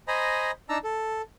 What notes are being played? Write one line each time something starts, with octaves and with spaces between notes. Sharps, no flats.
C5 D#5 G#5 A#5 B5
D4 D#4 A5 A#5 E6
A4